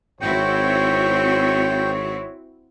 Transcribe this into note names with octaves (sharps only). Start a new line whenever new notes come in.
G#1 C4 E4 F#4 C#5 G5